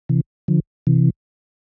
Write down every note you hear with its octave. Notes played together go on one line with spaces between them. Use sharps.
C3 E3
D3 F3
C3 E3